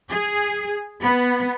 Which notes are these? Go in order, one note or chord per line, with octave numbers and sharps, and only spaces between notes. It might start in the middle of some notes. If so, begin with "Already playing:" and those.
G#4
B3